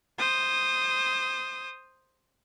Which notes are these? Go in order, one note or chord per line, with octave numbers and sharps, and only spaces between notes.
C5 D#6